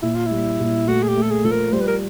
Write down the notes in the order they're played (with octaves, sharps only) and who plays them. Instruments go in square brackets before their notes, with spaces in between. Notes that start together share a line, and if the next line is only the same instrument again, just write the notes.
[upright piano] A#2 [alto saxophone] E4
[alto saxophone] F4
[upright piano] G3 [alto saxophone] E4
[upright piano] A#2
[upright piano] A3 [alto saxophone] F#4
[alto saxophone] G#4
G4
[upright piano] A3
[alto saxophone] A4
G#4
[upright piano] F3 [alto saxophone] A4
[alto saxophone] A#4
[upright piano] G3 [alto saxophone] C5
[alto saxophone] B4
A#4